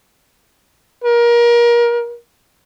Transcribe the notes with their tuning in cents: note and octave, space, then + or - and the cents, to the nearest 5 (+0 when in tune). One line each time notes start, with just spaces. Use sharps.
A#4 +30